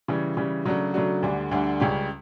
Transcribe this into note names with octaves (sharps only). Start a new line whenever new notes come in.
C#3 E3 G3
C#3 E3 G3
C#3 F#3 A3 D4 F#4
C#3 F#3 A3 D4 F#4
D2 D3 G3 D4
D2 D3 G3 D4
C#2 C#3 G3 C#4 G4